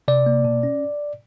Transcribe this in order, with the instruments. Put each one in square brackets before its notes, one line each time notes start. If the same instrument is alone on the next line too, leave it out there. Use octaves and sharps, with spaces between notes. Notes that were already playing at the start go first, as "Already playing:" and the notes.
[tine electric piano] C3 D5
A#3
B2
C#4